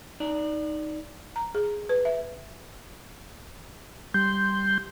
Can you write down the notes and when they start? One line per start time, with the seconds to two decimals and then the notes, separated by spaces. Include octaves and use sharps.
0.20 D#4 D5
1.36 A#5
1.55 G#4
1.89 B4
2.05 E5
4.14 G3 C6 G6